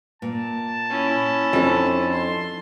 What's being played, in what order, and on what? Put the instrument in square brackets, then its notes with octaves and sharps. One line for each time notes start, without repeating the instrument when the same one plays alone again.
[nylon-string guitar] A#2 [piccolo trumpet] A5
[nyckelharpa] C#4 E4
[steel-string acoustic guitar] F2 [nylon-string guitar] D4 D#4 A4
[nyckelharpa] C6